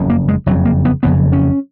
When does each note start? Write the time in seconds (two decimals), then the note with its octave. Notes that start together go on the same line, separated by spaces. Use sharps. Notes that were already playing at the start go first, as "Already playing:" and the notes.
Already playing: F#1 F2 C#3
0.10 A#3
0.28 G#3
0.46 F#1 F2 C#3 F#3
0.65 A#3
0.85 B3
1.03 F#1 F2 C#3 B3
1.32 C#4